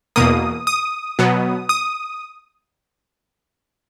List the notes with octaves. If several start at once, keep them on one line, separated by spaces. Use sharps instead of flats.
E2 B2 A#3 D#6
D#6
B2 F#3 B3
D#6